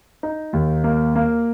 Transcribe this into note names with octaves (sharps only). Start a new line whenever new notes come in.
D#4
D#2
A#3
A#3